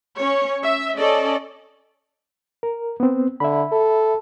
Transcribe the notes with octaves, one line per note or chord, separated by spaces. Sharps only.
C#4 C#5
E5
C#4 A4 D5 D#5
A#4
B3 C4
D3 E5 B5
A4